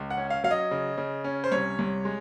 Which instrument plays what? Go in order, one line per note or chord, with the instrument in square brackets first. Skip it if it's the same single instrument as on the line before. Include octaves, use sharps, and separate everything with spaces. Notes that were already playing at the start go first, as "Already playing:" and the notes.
Already playing: [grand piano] C#2
F#5
C#4
F5
F#3 F5
D#5
C#3
C#3
C#4
C5
C2 C#5
C2
G#3